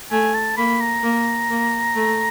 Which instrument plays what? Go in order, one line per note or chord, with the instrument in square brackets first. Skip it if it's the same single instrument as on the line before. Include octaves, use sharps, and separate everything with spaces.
[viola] A3 [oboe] G#5
[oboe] A5
[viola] A#3 [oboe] B5
[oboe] A#5
[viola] A#3
A#3
A3